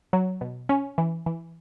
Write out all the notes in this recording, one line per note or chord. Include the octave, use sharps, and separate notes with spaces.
F#3
B2
C#4
E3
E3